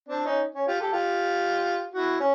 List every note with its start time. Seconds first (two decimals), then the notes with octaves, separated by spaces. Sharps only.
0.09 C4 D4
0.25 C#4 D#4
0.55 C#4
0.68 F4 G4
0.80 G4 A4
0.93 F4 G4
1.94 E4 F#4
2.20 C#4